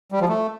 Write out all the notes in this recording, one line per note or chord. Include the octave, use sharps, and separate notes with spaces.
G3
F3
A3